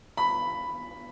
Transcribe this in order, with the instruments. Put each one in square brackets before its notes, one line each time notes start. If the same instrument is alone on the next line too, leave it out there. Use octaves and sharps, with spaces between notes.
[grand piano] B5